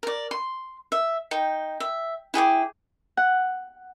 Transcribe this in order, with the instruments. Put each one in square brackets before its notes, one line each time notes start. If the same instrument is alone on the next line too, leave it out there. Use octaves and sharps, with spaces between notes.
[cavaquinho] A#4 D5
C6
E5
D#4 G5
E5
E4 G#4 G5 D6
[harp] F#5